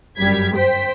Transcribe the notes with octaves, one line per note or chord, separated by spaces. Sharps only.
G1 F#2 G3 G#6 B6
C5 G5 B6